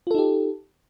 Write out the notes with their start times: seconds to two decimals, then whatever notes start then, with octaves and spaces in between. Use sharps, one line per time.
0.07 F4
0.11 A4
0.15 D#4
0.18 G4